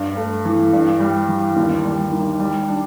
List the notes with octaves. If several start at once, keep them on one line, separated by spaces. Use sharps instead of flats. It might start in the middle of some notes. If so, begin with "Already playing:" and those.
Already playing: G2
A3
E3
G2
G3
E3
D#2
G3
D#3
G3
D4